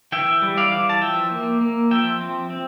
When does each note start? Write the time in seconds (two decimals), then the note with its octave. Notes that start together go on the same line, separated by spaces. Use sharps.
0.12 E3 E5 G5
0.42 G3
0.57 D5 F5
0.72 E3
0.89 A5
1.01 F3 E5 G5
1.31 A#3
1.61 A#3
1.91 F3 E5 G5
2.20 C4
2.50 C4